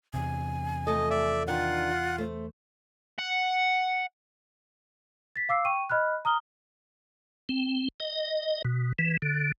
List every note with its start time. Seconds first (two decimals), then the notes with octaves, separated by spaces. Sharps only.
0.14 E2 C3 G#5
0.87 F3 A3 A4 D#5
1.10 D5 E5
1.48 D#3 D4 F4 F#5
2.18 A3 C5
3.19 F#5
5.36 A6 B6
5.49 F5 D6 E6 C7
5.65 G5 C#6 D#7
5.90 D#5 B5 F6 F#6
6.25 A#5 D#6 F6 G7
7.49 C4
8.00 D#5
8.65 B2
8.99 E3
9.22 D3